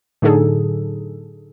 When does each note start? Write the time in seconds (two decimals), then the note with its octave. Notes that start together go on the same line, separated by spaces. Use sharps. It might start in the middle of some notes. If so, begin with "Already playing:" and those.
0.22 A2 D3 F#3 D#4 G#4 A4